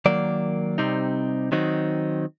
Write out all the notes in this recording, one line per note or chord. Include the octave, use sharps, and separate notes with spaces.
D#3 F#3 A#3 D5
C3 G3 C4 D#4
D#3 F#3 C4 D#4